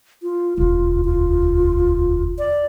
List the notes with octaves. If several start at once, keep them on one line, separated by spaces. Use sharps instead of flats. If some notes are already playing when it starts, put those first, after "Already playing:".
F4
E1 D2 F4
F4
D5